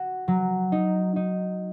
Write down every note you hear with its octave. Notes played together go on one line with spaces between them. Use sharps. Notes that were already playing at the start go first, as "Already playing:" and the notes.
Already playing: F#4
F#3
D#4
D#4